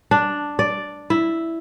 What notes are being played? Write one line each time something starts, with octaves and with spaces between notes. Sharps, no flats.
D4
D5
E4